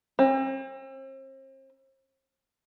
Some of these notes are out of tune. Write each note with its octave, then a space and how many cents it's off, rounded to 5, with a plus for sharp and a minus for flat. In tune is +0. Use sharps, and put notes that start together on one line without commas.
C4 +40